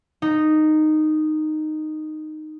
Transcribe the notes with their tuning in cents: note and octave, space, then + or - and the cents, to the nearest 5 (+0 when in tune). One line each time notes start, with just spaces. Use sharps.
D#4 -10